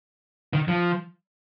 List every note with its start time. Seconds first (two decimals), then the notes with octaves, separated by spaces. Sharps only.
0.53 D#3
0.68 F3